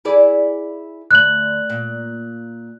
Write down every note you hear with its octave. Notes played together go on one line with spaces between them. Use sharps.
E4 G#4 D5
D2 F#6 F#7
A#2